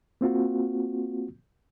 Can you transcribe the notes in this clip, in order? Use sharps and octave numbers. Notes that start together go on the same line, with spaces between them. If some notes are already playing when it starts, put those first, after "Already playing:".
A#3 C4 F4 F#4